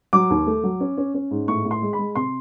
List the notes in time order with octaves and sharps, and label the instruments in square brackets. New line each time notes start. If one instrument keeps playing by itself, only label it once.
[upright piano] F#3 D6
D#2
A3
F#3
C#4
C#4
C#4
G#2
A2 C#6
A2
C6
G#3
B5
G#3
C3 C6